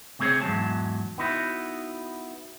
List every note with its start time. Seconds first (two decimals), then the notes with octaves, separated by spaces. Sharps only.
0.19 C3 A3 C4 G#4 C#5
0.42 E2 G#2 E3 F#3 A5
1.18 B3 D#4 E4 F#4